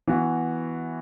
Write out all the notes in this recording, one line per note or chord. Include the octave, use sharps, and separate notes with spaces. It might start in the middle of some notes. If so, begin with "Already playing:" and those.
E3 B3 F#4